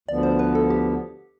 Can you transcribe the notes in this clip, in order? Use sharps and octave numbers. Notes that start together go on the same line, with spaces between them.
D2 D3 F3 B3 D5
C5
B4
A4
G4